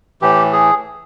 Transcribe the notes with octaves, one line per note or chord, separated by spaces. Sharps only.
A2 E3 G4
G#4